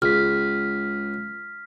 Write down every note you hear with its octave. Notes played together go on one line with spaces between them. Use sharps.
C#2 F6 B6